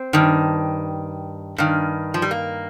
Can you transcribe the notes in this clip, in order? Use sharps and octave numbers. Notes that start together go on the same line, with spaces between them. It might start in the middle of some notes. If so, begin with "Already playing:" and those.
Already playing: C4
G2 D#3
G2 D#3
F3
G3
A#3